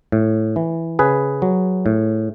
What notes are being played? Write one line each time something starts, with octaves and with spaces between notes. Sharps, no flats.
A2
E3
C#3 G#4 B4
F#3
A2